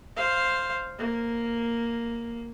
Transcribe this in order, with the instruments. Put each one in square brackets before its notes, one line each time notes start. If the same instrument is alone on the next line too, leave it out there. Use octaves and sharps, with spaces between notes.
[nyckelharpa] C5 F5
A#3